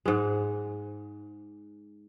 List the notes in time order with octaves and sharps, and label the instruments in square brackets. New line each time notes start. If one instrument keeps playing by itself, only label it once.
[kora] G#2 G#3